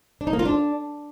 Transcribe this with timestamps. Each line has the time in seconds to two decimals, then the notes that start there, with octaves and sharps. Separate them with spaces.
0.21 D4
0.27 D#4
0.33 A#3
0.39 F4
0.45 D4